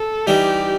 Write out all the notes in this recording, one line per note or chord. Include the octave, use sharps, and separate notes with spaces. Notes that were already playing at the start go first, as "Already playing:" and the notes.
Already playing: A4
E3 G3 D#4 G4